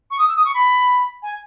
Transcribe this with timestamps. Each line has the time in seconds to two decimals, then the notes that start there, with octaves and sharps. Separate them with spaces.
0.11 C#6
0.18 D#6
0.28 E6
0.36 D#6
0.45 C#6
0.54 B5
1.22 G#5